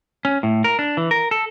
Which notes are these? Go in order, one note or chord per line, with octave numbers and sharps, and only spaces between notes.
C#4
A2
A#4
D4
E3
A#4
A4